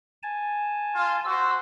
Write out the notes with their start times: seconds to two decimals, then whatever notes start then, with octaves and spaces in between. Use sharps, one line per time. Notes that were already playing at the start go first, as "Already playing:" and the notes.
0.23 G#5 A5
0.95 F4
1.25 F#4 C5 E6